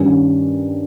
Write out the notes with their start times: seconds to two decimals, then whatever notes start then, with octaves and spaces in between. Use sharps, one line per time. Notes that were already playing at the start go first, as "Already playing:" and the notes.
Already playing: G2 D#3 G3 C#4